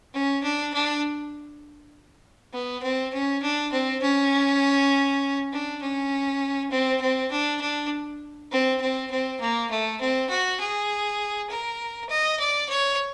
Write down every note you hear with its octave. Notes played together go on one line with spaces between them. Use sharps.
C#4
D4
D4
B3
C4
C#4
D4
C4
C#4
D4
C#4
C4
C4
D4
D4
C4
C4
C4
A#3
A3
C4
F#4
G#4
A#4
D#5
D5
C#5